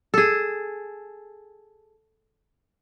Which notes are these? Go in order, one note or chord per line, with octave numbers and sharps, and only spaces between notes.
G#4 A4